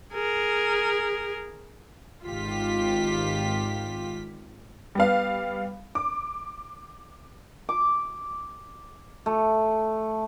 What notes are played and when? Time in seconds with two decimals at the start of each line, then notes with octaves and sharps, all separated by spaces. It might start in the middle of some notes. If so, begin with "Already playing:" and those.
0.13 G#4 A#4
2.24 G#1 F4 G4 B6
4.95 G3 B3 F5
5.95 D6
7.69 D6
9.26 A3